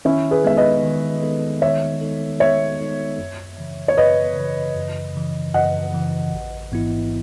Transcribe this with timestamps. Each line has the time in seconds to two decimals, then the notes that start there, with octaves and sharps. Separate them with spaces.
0.05 D#3 C#4 E4
0.31 G#4 B4
0.44 G#3 B3 D#4 A4 E5
0.57 B4 D#5
0.84 D#3
1.23 G#3 B3 D#4 A4
1.62 D#3 C#5 E5
2.01 G#3 B3 D#4 A4
2.40 D#3 C#5 E5
2.80 G#3 B3 D#4 A4
3.18 F#2
3.58 C#3 E3
3.88 C#5
3.97 F#2 B4 D#5
4.36 C#3 E3
4.76 F#2
5.15 C#3 E3
5.54 F#2 D#5 F#5
5.94 C#3 E3
6.33 A1
6.72 G#2 E3 B3 E4